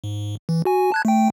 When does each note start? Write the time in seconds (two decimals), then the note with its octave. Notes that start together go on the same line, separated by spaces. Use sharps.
0.04 G#2
0.49 E3
0.65 F#4 G#5
0.92 A5 F#6 G#6
1.05 A3 G5